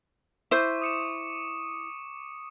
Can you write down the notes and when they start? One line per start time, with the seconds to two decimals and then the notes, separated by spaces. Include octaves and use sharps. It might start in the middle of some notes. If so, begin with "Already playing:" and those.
0.51 E4 C5 C#6 D6
0.82 D#6 C#7 E7